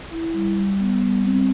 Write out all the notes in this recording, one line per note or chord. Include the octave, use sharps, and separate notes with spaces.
E4
G3
G3
B3
G3
C4